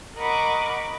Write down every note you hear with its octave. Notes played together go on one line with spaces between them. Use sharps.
A#4 D#5 F#5 B5 C#6 D6